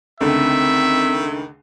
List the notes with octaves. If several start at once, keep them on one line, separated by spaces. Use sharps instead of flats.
C#2 D3 D#3 A3 C4 E5